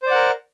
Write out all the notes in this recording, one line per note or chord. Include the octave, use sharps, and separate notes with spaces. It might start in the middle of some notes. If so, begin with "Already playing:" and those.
A#4 C5 D5 F#5